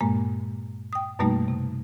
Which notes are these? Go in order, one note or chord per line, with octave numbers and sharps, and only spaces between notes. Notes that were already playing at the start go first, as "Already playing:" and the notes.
G2 A#2 G#3 A#3
G5 D#6
F#2 B2 G3 A3 A#3 D#4
C3